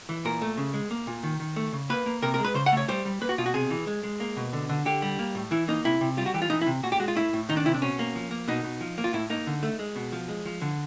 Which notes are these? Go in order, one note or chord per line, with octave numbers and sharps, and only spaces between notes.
E3
A#2 A#4
A3
C#3
G#3
A#3
A#2
D#3
D#3
A3
C#3
A#3 B4
A#3
C3 A#4
A#4
G#3
B4
C#3 C5
F#5
A3 C#5
G3 C5
G3
A#3 B4
F#4
B2 F4
F#4
C3 G#4
E3
G#3
G#3
A#3
B2
D3
D3
D3 G4
G3
A#3
A2
E3 E4
A#3 D#4
C3 E4
C3
G3 F4
F#4
E3 G4
F4
E3 D#4
E4
C3
A#2 F#4
G4
G#3 F#4
F4
A2 E4
A2
D#3 D#4
D4
C3 E4
D4
B2 C#4
A#3
F3
A#3
B2 D#4
B2
F3
A#3
F4
A2 E4
A#3 D#4
D3
A3
G#3
B2
F3
G#3
F3
D3